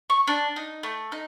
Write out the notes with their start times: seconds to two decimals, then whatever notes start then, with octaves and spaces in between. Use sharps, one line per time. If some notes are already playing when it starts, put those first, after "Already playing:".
0.10 C#6
0.27 D4
0.56 D#4
0.83 A3
1.12 D#4